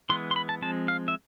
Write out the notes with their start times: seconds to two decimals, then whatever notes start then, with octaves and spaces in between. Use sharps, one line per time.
0.10 E3 G#3 B3 C6
0.31 C6
0.36 B5
0.49 A5
0.62 F3 G#3 C4 A5
0.88 F5
1.08 E5